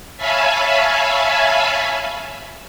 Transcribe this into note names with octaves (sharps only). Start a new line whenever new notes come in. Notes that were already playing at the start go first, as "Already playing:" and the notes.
C#5 E5 F5 G#5 A5 B5